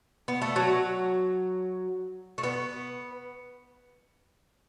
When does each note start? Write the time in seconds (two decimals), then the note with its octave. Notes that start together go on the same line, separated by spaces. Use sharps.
0.28 B3
0.42 A3
0.56 F#3
2.38 A3
2.43 B3